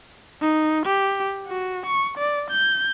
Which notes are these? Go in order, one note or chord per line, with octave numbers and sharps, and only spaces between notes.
D#4
G4
F#4
C#6
D5
G6